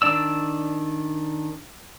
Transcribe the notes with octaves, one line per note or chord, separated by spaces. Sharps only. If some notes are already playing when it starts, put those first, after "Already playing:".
D#3 D4 D5 E6